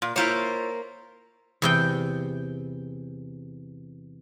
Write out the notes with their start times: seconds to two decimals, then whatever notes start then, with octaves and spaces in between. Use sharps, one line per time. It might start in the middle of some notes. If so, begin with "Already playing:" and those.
0.02 A#2
0.16 A#3 E4 F4 C5 C#5
1.62 E2 C3 G5